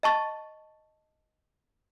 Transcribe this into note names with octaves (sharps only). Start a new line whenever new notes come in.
D#5 A5 C#6 A6